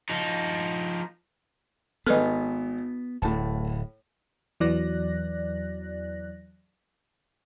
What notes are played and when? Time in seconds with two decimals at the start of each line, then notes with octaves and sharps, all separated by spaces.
0.10 F3 D#4
2.07 G#1 B3 A4 B4 D#5 F6
3.22 D1 A2 A5
4.60 E2 E3 F#3 D5 F#6 A#6